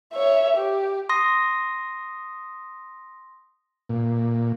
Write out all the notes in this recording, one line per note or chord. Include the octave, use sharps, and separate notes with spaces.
C#5 E5
G4
C6 D#6 A#6
A#2